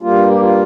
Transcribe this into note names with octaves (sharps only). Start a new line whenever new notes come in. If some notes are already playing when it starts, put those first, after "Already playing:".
G2 G3 A#3 F4
G4
F4